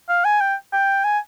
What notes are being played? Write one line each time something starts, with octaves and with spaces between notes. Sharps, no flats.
F5
G#5
G5
G5
G#5